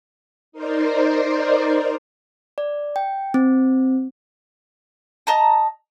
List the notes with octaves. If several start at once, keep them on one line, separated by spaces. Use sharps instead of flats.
D#4 A#4 C5 D5
D5
G5
C4
D#5 A5 A#5